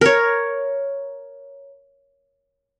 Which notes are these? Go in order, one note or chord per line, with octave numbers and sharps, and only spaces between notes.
A#4 C#5